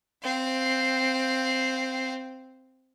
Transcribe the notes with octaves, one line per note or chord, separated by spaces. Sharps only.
C4 F5